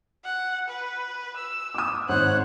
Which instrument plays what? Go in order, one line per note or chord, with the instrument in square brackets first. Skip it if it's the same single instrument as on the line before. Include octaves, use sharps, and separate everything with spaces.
[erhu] F#5
B4
E6
[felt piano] D6 D#6
[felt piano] G#1 [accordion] C5 C#5 F#5 [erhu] F#6